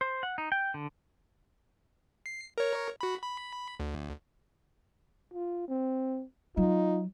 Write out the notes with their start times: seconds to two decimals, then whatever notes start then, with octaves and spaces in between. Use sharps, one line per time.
0.01 C5
0.23 F#5
0.38 D#4
0.52 G5
0.74 D3
2.26 C7
2.58 A#4 C#5
3.01 F#4 B5
3.22 B5
3.80 D2
5.34 F4
5.68 C4
6.57 F#3 D#4 F4